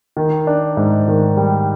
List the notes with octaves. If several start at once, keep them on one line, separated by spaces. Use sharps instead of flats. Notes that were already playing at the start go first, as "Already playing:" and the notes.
D#3
D4
G#2
D#3
G3